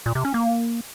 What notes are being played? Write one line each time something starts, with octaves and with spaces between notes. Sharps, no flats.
A#2
C3
C#4
A#3